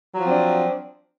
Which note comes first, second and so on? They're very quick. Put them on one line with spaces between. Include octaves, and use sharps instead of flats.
F#3 F3 C4 D4